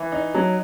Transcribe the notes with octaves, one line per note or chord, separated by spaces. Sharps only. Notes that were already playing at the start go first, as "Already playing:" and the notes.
Already playing: E3
D#4
F#3